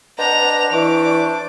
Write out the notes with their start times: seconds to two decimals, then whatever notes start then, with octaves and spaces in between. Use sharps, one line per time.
0.19 D4 B4 C5 D#5 F#5 A5 A#5 F7
0.73 E3 D5 C#6 D6